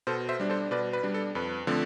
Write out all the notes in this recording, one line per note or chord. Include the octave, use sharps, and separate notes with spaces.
B2 A4 C5
C5 E5
G3 D4
A4 C5
B2 B4 D5
B4
G3 D4
A4
F2 B4
D3 F3 A3 C4